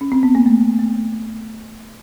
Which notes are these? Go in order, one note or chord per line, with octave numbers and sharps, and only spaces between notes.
C#4
C4
B3
A#3
A3
A3